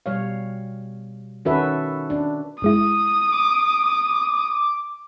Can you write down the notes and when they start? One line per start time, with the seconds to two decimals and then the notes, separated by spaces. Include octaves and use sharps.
0.06 B2 G3 C#5 F5
1.45 D#3 C#4 F#4 A4 B4 E5
2.10 D4
2.62 G1 G#3 E4 D#6
3.32 D6